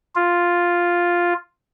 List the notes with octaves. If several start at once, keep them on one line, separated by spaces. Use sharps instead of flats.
F4